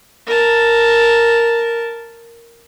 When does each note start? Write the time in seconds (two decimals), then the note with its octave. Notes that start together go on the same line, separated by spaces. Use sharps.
0.26 A#4 A5